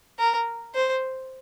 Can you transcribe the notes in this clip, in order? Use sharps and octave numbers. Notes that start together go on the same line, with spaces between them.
A#4
C5